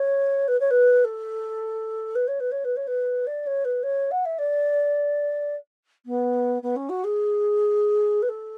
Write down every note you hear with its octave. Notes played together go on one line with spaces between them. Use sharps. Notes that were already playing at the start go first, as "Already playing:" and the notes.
Already playing: C#5
B4
C#5
B4
A4
B4
C#5
B4
C#5
B4
C#5
B4
D5
C#5
B4
C#5
F#5
E5
D5
B3
B3
C#4
F#4
G#4
B4
A4